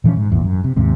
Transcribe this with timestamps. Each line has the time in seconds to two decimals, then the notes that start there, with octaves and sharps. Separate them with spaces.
0.04 A#2 E3 F3 C#4
0.17 G#2
0.30 G#1 E2 A#2
0.44 F#2
0.64 C3
0.76 D#2 G#2 C3